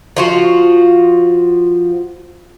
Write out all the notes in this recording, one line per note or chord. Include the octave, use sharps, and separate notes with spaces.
F3 F4 F#4